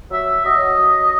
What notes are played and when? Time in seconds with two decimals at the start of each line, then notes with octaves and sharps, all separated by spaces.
0.10 F#3 E5
0.44 F#3 D#5
0.78 F#3